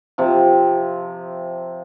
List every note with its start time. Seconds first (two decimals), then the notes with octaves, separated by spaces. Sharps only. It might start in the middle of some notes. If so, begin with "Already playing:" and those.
0.18 C3 F3